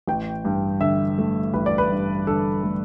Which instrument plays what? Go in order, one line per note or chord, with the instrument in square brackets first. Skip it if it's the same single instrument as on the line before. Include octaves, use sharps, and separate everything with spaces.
[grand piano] A1 G5
G2
D3 E5
A3
A1 B4
D5
B4
G2
D3 A4
A3